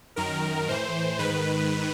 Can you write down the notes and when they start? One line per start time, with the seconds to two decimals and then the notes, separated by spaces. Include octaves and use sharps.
0.16 F#2 D#3 A#4
0.68 A2 E3 C5
1.18 G#2 D#3 B4